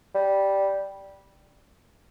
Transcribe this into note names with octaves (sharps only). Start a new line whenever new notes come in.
G3